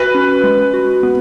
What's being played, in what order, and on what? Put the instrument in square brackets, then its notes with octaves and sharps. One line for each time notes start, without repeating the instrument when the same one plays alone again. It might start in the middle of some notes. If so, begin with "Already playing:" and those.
Already playing: [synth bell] F#4 [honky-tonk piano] B4
[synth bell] C#4
G#3
F#4
B3